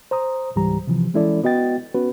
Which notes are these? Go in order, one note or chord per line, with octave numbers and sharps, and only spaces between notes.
C5 A#5 D#6
C#2 G#2 E3 G3 G4 A#5
C3 E3 F3
E3 G#3 C#4 E4 A4 D5
B3 F#4 D#5 G5 A6
B3 C#4 F#4 B4